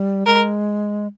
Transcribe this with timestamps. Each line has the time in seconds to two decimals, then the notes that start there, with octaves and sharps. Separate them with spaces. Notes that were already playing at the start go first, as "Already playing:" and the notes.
Already playing: G3
0.26 G#3 A#4